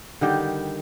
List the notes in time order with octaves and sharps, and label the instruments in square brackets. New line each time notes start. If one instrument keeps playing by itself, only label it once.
[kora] D3 D#3 G3 G4